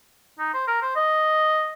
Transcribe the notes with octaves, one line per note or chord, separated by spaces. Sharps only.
D#4
C5
A#4
C5
D#5